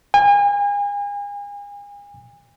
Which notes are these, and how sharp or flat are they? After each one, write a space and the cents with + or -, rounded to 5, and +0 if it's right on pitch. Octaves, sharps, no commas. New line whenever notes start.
G#5 -35